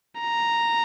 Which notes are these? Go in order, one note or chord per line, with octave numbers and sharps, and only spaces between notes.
A#5